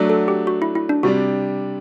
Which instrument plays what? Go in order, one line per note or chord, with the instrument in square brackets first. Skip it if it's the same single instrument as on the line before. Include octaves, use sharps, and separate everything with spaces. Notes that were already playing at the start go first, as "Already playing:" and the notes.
Already playing: [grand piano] F#3 A3 D4
[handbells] A4
G4
F#4
E4
E4
D4
[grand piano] C3 G3 D4 [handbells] F#4